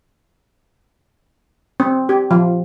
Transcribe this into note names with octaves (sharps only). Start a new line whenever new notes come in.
C4
G4
F3